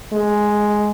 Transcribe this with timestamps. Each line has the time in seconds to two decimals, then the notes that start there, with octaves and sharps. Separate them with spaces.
0.12 G#3